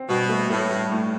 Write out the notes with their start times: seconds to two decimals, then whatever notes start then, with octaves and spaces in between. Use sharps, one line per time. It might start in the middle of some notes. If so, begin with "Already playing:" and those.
Already playing: C4
0.09 G2 B2
0.29 A3
0.50 A2 A3
0.71 G2
0.91 A2